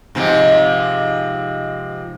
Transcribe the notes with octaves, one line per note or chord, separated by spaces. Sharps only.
G#2 C3 F3